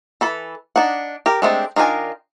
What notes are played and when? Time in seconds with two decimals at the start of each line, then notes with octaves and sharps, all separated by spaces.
0.21 E3 A4 B5
0.76 D4 D#4 F#5
1.26 G4 A#4
1.42 G#3 A3 C4 D4 G4
1.76 D#3 D4 F4 A#4 G#5